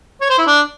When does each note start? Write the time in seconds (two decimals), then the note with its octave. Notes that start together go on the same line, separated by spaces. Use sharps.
0.21 C#5
0.30 C5
0.38 E4
0.47 D4